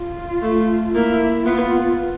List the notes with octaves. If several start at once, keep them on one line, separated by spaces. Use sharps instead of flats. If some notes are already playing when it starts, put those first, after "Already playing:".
Already playing: F4
A3
A#3 E4
B3 F4